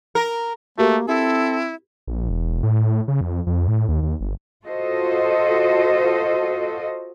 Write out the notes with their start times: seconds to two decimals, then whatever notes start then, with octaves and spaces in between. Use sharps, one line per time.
0.15 A#4
0.78 A3 A#3 F#4 G4 A#4
1.08 C4 E4 A4
2.08 A#1
2.30 E1
2.63 A2
3.08 C#3
3.21 F2
3.47 F2
3.68 A2
3.88 D#2
4.02 D#2
4.21 G1
4.65 F4 F#4 A4 C5 D#5